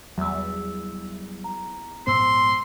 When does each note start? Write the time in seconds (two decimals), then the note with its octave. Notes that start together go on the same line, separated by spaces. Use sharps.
0.18 E2 F#3 G3 E5 E6
1.44 A#5
2.07 A#1 G#2 B3 C5 C6 E6